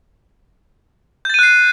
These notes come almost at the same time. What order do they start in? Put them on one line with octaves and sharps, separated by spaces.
G6 A6 D#7 F#6 C7